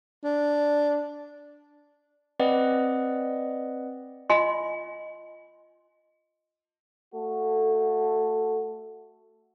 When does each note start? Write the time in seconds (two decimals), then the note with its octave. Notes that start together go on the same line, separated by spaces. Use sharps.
0.24 D4
2.40 C4 B4 D5 D#5 F#5
4.30 F4 D#5 G#5 C6
7.15 A3 F#4 A4